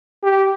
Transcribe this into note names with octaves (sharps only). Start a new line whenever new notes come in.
G4